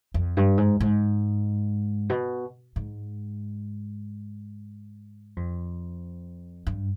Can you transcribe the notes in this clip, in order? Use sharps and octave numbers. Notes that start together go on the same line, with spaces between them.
F2
G2
G#2
G#2
B2
G#2
F2
G2